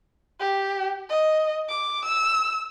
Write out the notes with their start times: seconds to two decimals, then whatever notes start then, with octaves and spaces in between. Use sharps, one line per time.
0.40 G4
1.10 D#5
1.69 D6
2.05 E6